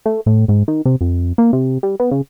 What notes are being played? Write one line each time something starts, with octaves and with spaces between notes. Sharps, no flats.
A3
A2
G#2
D#3
C3
F2
A#3
C3
G3
B3
C#3